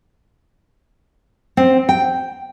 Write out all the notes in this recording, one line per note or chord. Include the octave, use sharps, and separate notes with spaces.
C4
G5